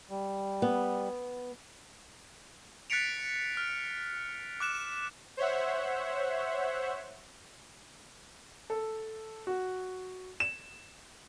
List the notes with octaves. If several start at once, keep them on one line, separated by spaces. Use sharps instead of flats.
G3
B3
F#6 A6 B6 C#7 D7 F7
F6
D6 F#6 E7
C5 C#5 E5 F#5
A4
F#4
E7